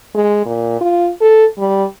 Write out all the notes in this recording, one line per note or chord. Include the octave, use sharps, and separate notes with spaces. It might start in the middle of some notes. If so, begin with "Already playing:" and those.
G#3
A#2
F4
A4
G3